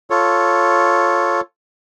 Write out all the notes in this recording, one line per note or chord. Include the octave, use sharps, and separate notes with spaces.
F4 A4 C#5